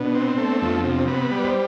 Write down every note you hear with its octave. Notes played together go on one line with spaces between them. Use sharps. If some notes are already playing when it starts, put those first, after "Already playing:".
Already playing: B2 B3 D4
C4
A3
F2
C3
B3
G3
C5